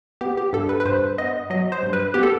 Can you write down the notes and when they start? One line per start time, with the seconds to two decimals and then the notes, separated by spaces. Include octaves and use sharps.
0.21 B3 G4
0.37 G4
0.53 G2 A4
0.69 B4
0.80 B4
0.85 G2 C5
1.18 B3 D#5
1.50 F#3 D#5
1.72 C5
1.83 G2
1.93 B4
2.14 B3 G4
2.23 A4